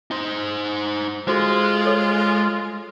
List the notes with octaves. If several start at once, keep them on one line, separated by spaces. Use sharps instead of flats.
D#4 C5
G#3 F4 F#4 A4 C5
A4 C#5